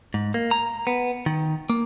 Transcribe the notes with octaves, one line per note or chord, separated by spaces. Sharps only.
G#2
A#3
A#5
B3
D#3
A#3